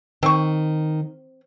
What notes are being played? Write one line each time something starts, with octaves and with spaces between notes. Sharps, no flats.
D#3 C4 C#6